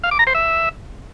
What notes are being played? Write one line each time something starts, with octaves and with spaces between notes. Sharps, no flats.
F5
D6
A#5
C5
E5